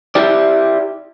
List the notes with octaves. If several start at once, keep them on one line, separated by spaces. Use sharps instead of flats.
E4 G4 D5